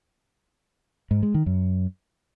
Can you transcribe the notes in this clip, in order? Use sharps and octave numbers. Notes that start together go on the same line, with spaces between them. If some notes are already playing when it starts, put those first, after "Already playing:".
G#2
G#3
D#3
F#2